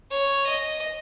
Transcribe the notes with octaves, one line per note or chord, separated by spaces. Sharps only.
C#5
D#5